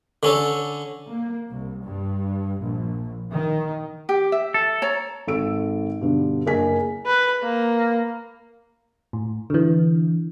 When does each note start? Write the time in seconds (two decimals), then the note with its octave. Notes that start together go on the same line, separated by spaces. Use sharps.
0.23 D3 C#4 A4
1.10 A#3
1.49 C2
1.83 G2
2.61 A#1
3.33 D#3
4.09 G4
4.32 E5
4.54 A4
4.82 C#5 A#5
5.27 G#1 A4 E6 D7
6.01 G2 B2 D3
6.46 F#1 G#4 A#4 D#5 G#5 B6
7.06 B4
7.43 A#3
9.13 A2
9.50 D3 E3